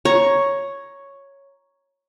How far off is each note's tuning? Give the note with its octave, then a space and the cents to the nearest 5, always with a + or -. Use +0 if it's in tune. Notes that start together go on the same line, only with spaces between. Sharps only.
C#5 +0 A#5 +10